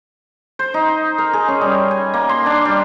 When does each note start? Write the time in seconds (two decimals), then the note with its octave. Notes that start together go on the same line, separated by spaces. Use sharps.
0.59 C5
0.74 D#4
1.18 A#4
1.33 G#4
1.48 C#4
1.61 G3
1.91 G#5
2.14 A#3
2.29 C6
2.46 D4
2.65 G3